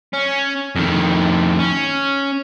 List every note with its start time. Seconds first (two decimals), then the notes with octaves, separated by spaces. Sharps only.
0.14 C#4
0.75 F2 D#3
1.59 C#4